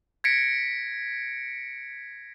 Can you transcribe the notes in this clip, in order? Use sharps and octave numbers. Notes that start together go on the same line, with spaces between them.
G#6 A#6 B6 C#7 D7